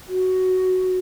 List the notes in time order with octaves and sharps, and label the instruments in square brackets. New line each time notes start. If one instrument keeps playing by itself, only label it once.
[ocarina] F#4